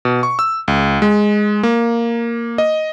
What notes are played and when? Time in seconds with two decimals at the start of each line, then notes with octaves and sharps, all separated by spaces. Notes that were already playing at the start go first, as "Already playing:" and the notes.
0.05 B2
0.23 C#6
0.39 E6
0.68 C#2
1.02 G#3
1.63 A#3
2.58 D#5